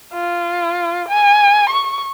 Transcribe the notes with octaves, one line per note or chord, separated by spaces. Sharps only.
F4
G#5
C#6